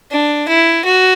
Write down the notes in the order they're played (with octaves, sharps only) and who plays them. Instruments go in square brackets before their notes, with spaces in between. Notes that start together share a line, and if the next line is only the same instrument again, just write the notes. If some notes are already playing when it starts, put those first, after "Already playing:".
[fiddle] D4
E4
F#4